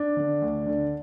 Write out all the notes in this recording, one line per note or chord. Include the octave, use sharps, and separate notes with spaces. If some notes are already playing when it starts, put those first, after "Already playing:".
Already playing: D4
D3
D2
D3